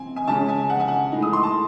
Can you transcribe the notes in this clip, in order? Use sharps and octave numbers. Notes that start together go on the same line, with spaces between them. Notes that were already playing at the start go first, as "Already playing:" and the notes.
Already playing: C4 G#5
G#5
C#3 G#3 C#4 A5
G#5
F#5
G#5
F#5
A2 G#3 D#4
D#6
C6
A5